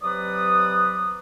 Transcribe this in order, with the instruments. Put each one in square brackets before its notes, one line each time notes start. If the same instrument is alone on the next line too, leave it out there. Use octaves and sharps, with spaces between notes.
[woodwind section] C3 F#3 B4 D5 D#6